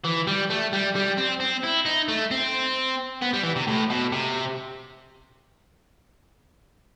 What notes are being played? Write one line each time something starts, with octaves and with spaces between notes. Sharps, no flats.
E3
G3
A3
G3
G3
C4
C4
E4
D#4
A3
C4
B3
G3
E3
C3
A2
B2
C3